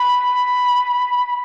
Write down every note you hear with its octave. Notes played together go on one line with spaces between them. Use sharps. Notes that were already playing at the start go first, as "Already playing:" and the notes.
Already playing: B5